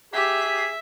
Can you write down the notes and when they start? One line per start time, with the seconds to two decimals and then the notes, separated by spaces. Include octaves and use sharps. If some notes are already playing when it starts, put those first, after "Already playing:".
0.13 G4 G#4 E5 B6